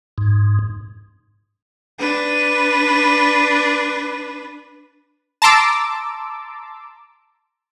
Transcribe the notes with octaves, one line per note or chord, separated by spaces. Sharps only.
G#2
D4 B4
A5 A#5 C6 D6 E6